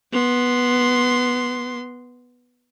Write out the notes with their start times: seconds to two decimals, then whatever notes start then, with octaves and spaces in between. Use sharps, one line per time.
0.12 B3 C6